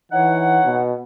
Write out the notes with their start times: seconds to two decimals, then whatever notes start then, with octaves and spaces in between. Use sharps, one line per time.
0.12 E3 D#4 C#5 F#5
0.65 B2